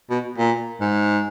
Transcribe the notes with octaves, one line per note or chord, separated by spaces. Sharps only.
B2
A#2
G#2